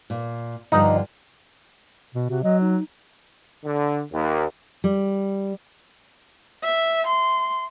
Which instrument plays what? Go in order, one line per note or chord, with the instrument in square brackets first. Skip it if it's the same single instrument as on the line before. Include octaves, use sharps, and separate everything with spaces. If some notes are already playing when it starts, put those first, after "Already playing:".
[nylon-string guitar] A#2
[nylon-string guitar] G2 D3 F3 [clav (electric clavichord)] D#4
[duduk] B2
[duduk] C3 [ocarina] F#4
[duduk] F#3 [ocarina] D#5
[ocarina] D#4
[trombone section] D3
D#2
[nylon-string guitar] G3
[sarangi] E5
C6